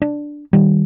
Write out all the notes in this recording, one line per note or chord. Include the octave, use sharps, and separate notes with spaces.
D4
D#3 G3